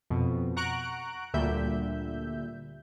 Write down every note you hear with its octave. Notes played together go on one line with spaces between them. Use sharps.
F2 B2
F#5 A#5 C#6 F#6 D7
D2 A#2 D3 G3 E5 G6